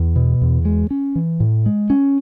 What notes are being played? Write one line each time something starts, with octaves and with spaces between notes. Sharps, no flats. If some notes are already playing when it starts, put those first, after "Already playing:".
Already playing: E2
B2
E2
G#3
C#4
E3
A2
G#3
C#4